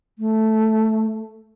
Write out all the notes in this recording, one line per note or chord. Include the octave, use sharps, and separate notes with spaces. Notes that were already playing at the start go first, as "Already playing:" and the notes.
A3